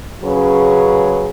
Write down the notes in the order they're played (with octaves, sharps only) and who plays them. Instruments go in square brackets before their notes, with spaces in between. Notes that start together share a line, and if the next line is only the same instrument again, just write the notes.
[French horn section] C#3 F#3 C#4 G#4 B4